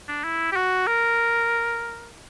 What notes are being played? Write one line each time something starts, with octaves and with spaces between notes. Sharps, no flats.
D4
E4
G4
F#4
A#4